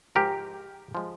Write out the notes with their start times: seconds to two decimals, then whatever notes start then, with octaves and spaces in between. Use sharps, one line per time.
0.15 G#2 F3 G#3 G4 A#4
0.95 F3 G#3